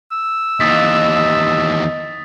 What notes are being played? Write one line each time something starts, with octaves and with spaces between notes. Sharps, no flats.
E6
D#2 E3 D#5 D#6 A6 B6